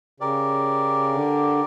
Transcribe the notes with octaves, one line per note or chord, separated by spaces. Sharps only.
C#3 G4 A#4 D5
D3